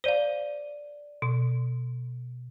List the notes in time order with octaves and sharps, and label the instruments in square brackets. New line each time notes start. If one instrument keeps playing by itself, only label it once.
[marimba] C5 F5 [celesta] D5 D#7 G7
[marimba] B2